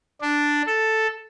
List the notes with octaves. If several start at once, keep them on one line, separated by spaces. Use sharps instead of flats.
D4
A4